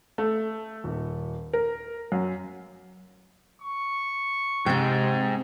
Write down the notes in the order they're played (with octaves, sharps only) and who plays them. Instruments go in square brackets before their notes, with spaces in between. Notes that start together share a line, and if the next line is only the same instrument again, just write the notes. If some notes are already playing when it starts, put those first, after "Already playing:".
[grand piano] A3
D#1
A#4
F#2
[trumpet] C#6
[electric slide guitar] G#2 [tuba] C3 [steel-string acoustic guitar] C4 G5